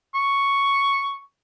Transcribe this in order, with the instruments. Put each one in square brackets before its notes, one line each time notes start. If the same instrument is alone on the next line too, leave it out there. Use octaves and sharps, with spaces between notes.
[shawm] C#6